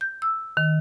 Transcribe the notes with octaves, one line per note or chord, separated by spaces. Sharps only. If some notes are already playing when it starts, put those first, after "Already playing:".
G6
E6
D#3